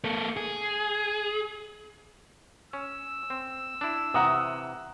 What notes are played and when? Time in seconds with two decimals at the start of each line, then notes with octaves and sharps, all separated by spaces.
0.04 A#3 A4
0.37 G#4
2.73 C#4 E6
3.30 C4
3.81 D4 E4
4.14 C3 E3 F#5 A#5 D#6